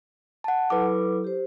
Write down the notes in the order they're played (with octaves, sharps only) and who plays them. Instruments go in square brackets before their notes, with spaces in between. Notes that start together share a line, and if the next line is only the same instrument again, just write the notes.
[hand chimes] F#5 A5
[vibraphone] F#3 E4 A4 [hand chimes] B4 D6
[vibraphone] G4 C5